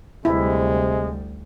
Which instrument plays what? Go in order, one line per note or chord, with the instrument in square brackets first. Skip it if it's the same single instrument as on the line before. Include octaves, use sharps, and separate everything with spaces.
[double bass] D2 G3 [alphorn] C3 [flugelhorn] G#3 [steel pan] E4